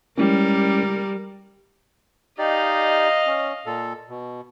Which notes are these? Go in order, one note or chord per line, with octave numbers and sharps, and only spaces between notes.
G3 G#3 C#4 E4 A#4
D#4 G4 D5 D#5 F5
C#4
A#2 A4
B2